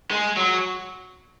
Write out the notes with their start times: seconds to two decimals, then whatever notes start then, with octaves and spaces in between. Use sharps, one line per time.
0.11 G#3
0.37 F#3